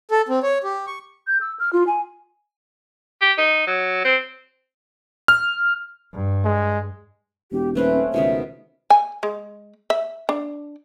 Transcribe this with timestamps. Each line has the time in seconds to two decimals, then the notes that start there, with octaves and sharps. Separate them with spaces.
0.11 A4
0.29 C4
0.43 C#5
0.63 G4
0.87 C#6
1.27 G6
1.41 E6
1.60 F6
1.73 F4
1.87 G#5
3.22 G4
3.38 D#4
3.67 F#3
4.05 C4
5.28 F6
6.13 G2
6.45 G#3
7.52 E1 G4
7.75 D#1 A3 C4 C#4 B4
8.14 C#2 B2 D#3 B3 E5
8.90 G#5
9.23 G#3
9.90 E5
10.29 D4